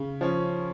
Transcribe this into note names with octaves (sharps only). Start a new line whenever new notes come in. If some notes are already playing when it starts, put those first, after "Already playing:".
Already playing: C#3
F3 C#4